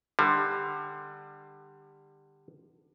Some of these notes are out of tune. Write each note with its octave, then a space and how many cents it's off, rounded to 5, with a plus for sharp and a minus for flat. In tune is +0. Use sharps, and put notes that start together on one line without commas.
D3 +25 G3 +20